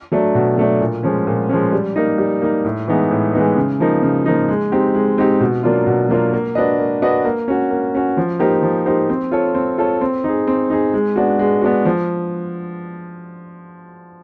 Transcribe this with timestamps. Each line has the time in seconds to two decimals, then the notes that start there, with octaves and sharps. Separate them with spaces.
0.12 F#3 A3 D4
0.35 B2
0.57 F#3 A3 D4
0.81 A#2
1.03 F3 G#3 C#4
1.27 A#2
1.49 F3 G#3 C#4
1.72 G3
1.96 A#3 D#4
2.18 G3
2.42 A#3 D#4
2.65 A2
2.88 E3 G#3 B3 D#4
3.11 A2
3.33 E3 G#3 B3 D#4
3.56 C#3
3.80 F3 A#3 D#4
4.02 C#3
4.26 F3 A#3 D#4
4.49 G#3
4.72 C4 D#4 G4
4.95 G#3
5.18 C4 D#4 G4
5.41 B2
5.63 F#3 A#3 D4 F4
5.87 B2
6.09 F#3 A#3 D4 F4
6.33 A#3
6.55 D4 F#4 B4 D#5
6.79 A#3
7.02 D4 F#4 B4 D#5
7.25 A#3
7.48 C#4 F#4
7.70 A#3
7.94 C#4 F#4
8.17 F3
8.39 A#3 D#4 G4 C5
8.62 F3
8.86 A#3 D#4 G4 C5
9.09 C4
9.31 F4 A4 C#5
9.55 C4
9.78 F4 A4 C#5
10.01 C4
10.24 D#4 G#4
10.47 C4
10.70 D#4 G#4
10.94 G#3
11.16 B3 D4 F#4
11.39 G#3
11.62 B3 D4 F#4
11.85 F3